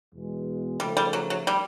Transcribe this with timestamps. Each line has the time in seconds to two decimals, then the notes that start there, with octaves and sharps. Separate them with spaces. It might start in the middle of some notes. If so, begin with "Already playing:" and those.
0.13 E2 B2 G#3
0.80 C#3 F3 G3 A3
0.97 G3
1.13 F#3
1.30 F#3
1.47 G3